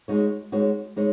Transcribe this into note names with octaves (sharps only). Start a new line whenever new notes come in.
G#3 D#4 F#4 C#5
G#3 D#4 F#4 C#5
G#3 D#4 C#5